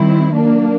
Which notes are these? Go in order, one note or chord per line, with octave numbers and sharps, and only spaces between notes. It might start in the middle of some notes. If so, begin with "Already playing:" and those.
Already playing: D#3 G3 C4 E4
F#3 A#3 D4